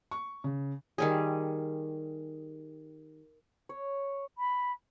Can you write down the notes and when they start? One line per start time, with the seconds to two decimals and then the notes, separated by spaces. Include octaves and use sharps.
0.11 C#6
0.44 C#3
0.98 D#3 G3 G#4
3.69 C#5
4.38 B5